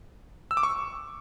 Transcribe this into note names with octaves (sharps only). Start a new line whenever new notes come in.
E6
D6
C#6